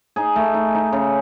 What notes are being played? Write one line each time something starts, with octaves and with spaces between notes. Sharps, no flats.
D#4 G#4
A3
D#4
D#4
C#3